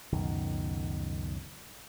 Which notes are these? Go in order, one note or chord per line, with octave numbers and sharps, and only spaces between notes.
C#2 F#2 B2 D#3